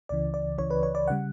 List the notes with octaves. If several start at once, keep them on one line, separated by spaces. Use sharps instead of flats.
C#2 C#3 E3 D5
D5
C#2 C#3 E3 C#5
B4
C#5
D5
C#3 G3 F#5